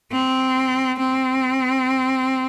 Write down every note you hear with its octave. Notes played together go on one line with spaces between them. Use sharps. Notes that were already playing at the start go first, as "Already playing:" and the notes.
C4
C4